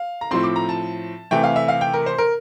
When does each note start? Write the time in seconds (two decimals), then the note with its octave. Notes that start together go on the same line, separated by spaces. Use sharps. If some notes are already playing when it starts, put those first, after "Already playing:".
Already playing: F5
0.21 A#5
0.31 A2 F3 C4 C6
0.43 D6
0.56 A#5
0.69 A5
1.31 C3 E3 A3 G5
1.43 F5
1.56 E5
1.68 F5
1.81 G5
1.94 A#4
2.06 C5
2.18 A#4